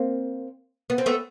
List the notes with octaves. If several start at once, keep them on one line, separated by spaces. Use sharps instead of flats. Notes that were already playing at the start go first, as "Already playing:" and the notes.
Already playing: A#3 C4
B3
C4
A3 B3